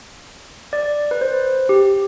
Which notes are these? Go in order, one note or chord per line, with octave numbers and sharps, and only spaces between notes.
D5
B4
C5
G4